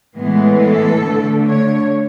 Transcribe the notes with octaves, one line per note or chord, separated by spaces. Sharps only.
A2 E3 G#3 B3
A4
D3 A3
C#5